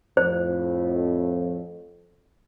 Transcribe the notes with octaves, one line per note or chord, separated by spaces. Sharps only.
F2 A2 C5